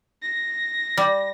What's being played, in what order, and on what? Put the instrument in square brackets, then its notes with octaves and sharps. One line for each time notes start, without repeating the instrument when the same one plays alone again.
[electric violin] A#6
[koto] G3